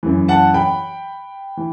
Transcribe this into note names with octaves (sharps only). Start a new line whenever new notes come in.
F#2 E3
F#5 A5
G5 B5
E3